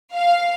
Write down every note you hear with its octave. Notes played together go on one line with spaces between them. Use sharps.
F5